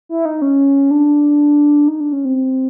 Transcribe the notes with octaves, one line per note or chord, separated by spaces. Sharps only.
E4
D#4
C#4
D4
D#4
D4
C#4
C4